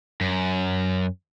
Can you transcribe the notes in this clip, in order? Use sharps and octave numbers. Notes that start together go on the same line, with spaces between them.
F#2